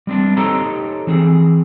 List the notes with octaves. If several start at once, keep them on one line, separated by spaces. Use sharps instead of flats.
G3 C4 D4
D#4 G4 A4 C5 C#5 A#5
E3 C4 G#4